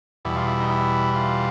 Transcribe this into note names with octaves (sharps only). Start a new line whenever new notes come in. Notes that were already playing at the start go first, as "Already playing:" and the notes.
E2 B2 G3 E4
F4
E4
D#4
E4
F4